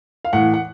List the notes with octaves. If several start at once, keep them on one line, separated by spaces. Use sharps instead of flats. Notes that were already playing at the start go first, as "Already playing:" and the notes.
F5
A2 E3 F#5
F#5